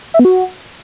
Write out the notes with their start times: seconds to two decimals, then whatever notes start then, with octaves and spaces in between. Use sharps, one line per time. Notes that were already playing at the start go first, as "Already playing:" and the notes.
0.14 E5
0.19 B3
0.25 F#4